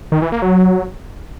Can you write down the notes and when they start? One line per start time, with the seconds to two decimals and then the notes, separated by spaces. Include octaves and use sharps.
0.12 D#3
0.22 E3
0.32 A#3
0.42 F#3